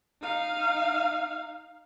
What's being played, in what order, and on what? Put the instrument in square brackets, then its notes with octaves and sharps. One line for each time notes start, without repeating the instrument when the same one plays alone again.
[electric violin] D#4 F5